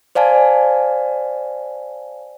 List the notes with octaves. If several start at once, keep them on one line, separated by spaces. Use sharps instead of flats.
C5 D5 F5 G#5 A5